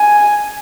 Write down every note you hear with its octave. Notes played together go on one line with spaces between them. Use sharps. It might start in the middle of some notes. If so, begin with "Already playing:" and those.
Already playing: G#5